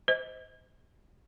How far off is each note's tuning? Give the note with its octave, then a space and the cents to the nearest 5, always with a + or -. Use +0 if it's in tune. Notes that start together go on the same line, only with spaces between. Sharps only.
C5 -20 D#5 +20